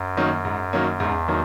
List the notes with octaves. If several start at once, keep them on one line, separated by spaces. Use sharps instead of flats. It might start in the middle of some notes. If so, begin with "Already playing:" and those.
Already playing: F#2
D#3 F#3 A#3 C#4
G#2
D#3 F#3 A#3 C#4
E2 G#2
D#3 F#3 A#3